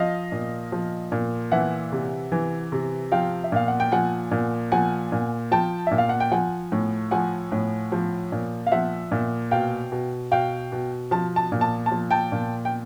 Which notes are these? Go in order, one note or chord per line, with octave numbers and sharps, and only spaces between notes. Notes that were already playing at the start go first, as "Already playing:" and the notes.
Already playing: F3 D#5 F5
A#2
F3
A#2
E3 E5 F#5
C3
E3
C3
F3 F5 G5
E5
A#2 F5
F#5
G5
F3 F#5 G#5
A#2
F3 F#5 G#5
A#2
F3 G5 A5
A#2 E5
F5
F#5
G5
F3 F#5 G#5
A2
F3 F#5 G#5
A2
F3
A#2
F5
F3 E5 F#5
A#2
B2 F5 G5
B2
B2 F5 G5
B2
F3 A5
A5
A#2
A5
A5
F3
G5 A5
A#2
G5